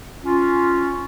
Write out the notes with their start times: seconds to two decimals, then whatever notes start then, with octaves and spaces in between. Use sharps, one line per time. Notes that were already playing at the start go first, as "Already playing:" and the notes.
0.23 C#4 F4